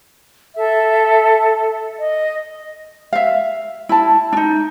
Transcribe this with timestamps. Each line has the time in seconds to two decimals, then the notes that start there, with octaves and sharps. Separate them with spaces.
0.56 A4 E5
1.99 D#5
3.13 E5 F5
3.89 E4 A5
4.33 D4 D#4